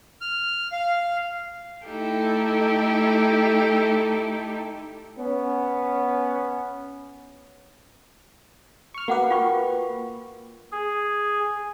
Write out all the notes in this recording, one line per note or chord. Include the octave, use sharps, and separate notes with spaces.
F6
F5
A3 D#4 E4 G4 A4
B3 C#4
C#6 F6
A#3 F#4 B4 F#5 D6
F4 G5 C#6
G#4